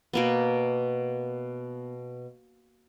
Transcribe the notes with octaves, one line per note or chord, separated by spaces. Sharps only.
B2 A#3 B3